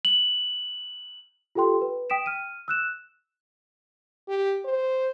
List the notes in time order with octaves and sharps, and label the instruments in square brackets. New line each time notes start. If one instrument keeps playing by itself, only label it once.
[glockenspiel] F#7
[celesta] F4 G4 A4 G5 C6
B4
G5 D#6 B6 D7 E7
F6 D#7
E6 F#6 E7
[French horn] G4
C5